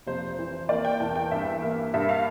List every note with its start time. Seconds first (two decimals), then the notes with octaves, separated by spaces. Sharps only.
0.07 F1 C5
0.39 E3
0.69 A#3 D5
0.85 G5
1.00 E2 A5
1.15 G5
1.31 G2 E5
1.62 A#3
1.94 G2 E5
2.09 F5